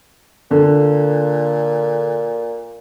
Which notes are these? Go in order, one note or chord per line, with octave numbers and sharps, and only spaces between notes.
A#2 D3